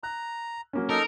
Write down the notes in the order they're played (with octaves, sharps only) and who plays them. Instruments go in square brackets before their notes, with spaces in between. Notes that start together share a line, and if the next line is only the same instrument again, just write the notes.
[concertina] A#5 [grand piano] F#6
[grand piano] F#3 A#3 C#4
[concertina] D#4 A4 A#5 [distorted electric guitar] A#4